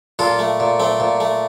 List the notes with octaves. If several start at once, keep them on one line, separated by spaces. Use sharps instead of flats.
A#2 F4 A4
A3
A#2
A3 C4
A#2
A3